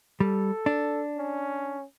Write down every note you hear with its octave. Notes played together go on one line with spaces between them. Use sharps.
G3 A4
D4
C#4